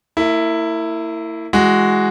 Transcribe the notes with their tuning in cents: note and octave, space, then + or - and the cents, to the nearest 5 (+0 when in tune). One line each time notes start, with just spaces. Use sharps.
A#3 -40 E4 +0
E3 -5 G#3 +0 F#4 +0